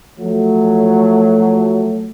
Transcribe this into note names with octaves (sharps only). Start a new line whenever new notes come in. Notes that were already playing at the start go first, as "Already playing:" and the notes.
F3 F#3 A3